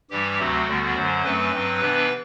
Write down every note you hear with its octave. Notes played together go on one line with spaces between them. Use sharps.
G2 E3 G3 G4
D2 C3 F#3 A3 C4 F#4
D2 D3 G3 B3
F#2 D3 F#3 C5
F#2 F#3 A3 C4 B4
G2 F#3 C4
C3 E3 B3 D4